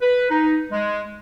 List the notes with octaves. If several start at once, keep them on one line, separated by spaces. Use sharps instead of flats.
B4
D#4
G#3